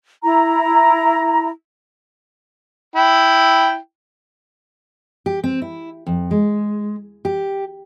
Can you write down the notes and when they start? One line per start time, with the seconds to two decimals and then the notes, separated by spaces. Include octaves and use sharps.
0.24 E4 A#5
2.96 E4 G5
5.26 G4
5.44 C4
5.62 E4
6.06 F2
6.31 G#3
7.25 G4